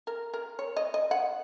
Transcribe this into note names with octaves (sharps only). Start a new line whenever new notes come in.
A#4
A#4
C#5
D#5
D#5
F#5